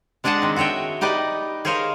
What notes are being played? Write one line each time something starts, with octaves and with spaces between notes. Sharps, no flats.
G#3 D4 G#4 D#5 F#5 A5
D#3 C4
F#4 G#4 C#5 E5 G5
D#4 G4 B4 D5 D#5
G#4 A#4 C5 C#5 D#5 F5